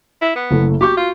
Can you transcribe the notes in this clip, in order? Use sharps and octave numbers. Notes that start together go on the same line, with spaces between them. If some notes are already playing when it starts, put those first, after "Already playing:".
E4
B3
F#1 A3 E4
F#4 G4 C#6 G6
F4